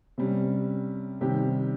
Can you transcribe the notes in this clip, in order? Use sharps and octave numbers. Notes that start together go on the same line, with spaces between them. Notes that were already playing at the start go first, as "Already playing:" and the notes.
C3 G3 C#4
C3 D#3 G3 C#4 G4